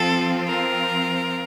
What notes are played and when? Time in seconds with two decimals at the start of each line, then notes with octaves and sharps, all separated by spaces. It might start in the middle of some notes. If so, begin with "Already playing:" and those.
Already playing: F3 C4 F4 A4
0.47 A#4